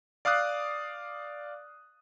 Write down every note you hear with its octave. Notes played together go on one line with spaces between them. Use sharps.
D5 F5 D6 D#6 F#6 C7